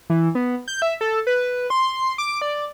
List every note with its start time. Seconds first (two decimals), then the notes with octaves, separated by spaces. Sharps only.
0.10 E3
0.35 B3
0.68 G6
0.82 E5
1.01 A4
1.27 B4
1.70 C6
2.18 D6
2.41 D5